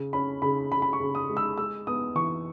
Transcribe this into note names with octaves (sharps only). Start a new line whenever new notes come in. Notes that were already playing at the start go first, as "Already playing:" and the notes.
Already playing: C#3
C#4 B5
C#3 B5
C#3 B5
B5
C#6
C#3
D#6
G#3
E6
G#3 E6
B3 D#6
E3 C#6